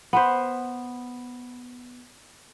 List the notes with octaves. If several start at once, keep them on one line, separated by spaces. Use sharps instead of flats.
B3 B4 C5